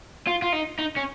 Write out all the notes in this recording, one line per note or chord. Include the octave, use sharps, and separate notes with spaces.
F4
F4
D#4
D#4
C#4